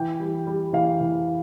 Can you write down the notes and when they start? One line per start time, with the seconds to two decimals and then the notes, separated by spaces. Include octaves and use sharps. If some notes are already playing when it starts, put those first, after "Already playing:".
Already playing: E3 G5
0.20 G3
0.47 G3
0.73 E3 F5
1.00 E3